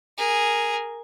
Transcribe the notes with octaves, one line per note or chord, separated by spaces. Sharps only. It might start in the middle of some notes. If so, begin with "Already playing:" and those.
G#4 A#4